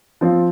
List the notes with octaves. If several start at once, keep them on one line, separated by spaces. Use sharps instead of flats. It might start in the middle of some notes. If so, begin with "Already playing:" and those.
F3 C4 F4